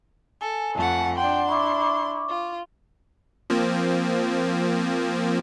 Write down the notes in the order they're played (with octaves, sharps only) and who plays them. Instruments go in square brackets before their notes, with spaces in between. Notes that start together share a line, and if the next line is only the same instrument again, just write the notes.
[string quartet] A4 [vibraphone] G#5
[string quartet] F2 A3 F#5 [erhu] A5
[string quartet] D4 C6 [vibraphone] F#5 [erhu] G5
[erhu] E4 [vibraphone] C#6 D6
[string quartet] F4
[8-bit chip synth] F3 A#3 C4